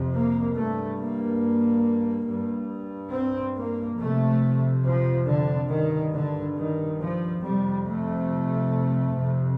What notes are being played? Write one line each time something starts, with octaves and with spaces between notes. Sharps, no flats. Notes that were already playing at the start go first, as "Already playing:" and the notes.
Already playing: F2 C3
A#3
G2 A3
A#3
G2
C4
A#3
F2 C3 A3
F3
D3
G2 D#3
D3
D#3
F3
F2 C3 G3
A3
F2 C3